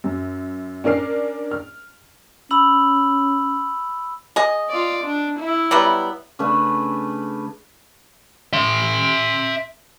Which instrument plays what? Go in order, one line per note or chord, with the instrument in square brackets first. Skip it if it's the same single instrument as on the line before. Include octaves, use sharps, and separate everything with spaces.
[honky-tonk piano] F#2
C#4 D4 A#4 F6 C7
F6
[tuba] C#4 [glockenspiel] B5 E6 F#7
[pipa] G#4 D#5
[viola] F4 D5
D4
E4
[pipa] F#3 G3 B3
[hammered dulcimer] C#3 A3 D4 B4
[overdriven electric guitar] E5 C6